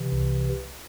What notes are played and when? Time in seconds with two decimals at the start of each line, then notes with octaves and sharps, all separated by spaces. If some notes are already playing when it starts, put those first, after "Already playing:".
Already playing: C3 E3
0.12 C2